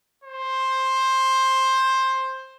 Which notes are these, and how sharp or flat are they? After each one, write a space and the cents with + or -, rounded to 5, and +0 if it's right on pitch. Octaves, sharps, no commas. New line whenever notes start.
C5 +10